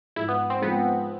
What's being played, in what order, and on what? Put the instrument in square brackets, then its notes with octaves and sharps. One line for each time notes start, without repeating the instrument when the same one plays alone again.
[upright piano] G#2 F3 G#3 [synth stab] E4
[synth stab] B3
C4
[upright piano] G#2 F3 G#3 [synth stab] B3